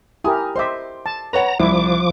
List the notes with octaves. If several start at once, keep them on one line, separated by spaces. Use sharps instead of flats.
E4 G4 A#4 G#5 D#6
C5 D#5 E5 C6 D6
A5
B4 C#5 F#5 A#5
C2 F3 E4 D6